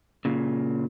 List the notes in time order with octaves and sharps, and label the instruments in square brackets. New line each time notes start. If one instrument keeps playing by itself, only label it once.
[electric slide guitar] A#2 C#3